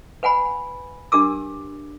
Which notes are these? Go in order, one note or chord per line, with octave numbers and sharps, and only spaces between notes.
B4 F#5 G#5 B5
D4 G4 A#4 D6 E6